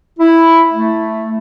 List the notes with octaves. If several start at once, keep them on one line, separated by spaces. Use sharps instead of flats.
E4
A3